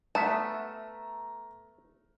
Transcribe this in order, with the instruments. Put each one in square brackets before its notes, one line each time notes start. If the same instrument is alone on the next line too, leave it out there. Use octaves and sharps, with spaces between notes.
[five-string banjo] A3 [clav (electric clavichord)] B3 E5 [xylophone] A5 [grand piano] A#5 F6